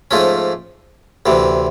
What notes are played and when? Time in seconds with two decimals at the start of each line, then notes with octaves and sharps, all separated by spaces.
0.11 G#2 F3 A3 C#4
1.26 D2 C3 E3